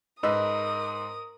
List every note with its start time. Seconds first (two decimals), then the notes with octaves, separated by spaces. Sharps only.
0.23 G#2 A#4 B4 D#5 D#6 E6